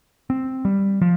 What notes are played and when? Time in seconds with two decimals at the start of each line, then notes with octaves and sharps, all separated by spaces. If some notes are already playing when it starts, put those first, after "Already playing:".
0.30 C4
0.65 G3
1.01 F3